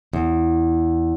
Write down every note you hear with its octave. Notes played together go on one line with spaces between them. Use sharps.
E2